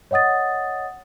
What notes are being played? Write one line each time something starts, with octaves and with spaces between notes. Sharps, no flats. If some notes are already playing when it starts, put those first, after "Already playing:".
C#5 D#5 F#5 D#6 A6